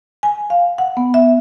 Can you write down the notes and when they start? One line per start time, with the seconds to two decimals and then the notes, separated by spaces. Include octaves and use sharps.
0.23 G#5
0.50 F5
0.78 F#5
0.97 B3
1.14 E5